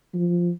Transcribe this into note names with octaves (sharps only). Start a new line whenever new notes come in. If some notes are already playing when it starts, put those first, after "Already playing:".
F3